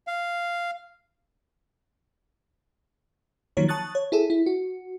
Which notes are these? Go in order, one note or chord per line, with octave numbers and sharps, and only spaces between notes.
F5
D#3 F3 F#3 A#3 C#5
A5 C#6 D#6 F#6 A6
C#5
E4 G#4 A4
E4
F#4